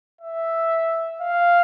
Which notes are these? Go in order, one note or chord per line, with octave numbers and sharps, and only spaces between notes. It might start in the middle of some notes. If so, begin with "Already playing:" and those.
E5
F5